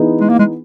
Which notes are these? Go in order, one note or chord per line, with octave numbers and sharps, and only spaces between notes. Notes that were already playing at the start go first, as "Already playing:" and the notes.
Already playing: E3 B3 D#4 G#4
G#3
A#3
G#3